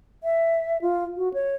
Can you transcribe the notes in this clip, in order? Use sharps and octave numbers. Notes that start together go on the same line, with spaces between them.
E5
F4
F#4
C#5